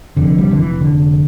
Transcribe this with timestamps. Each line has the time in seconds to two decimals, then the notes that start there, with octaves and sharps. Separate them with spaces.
0.17 F1 F2 D3
0.38 G3
0.51 D3
0.59 E3
0.81 D3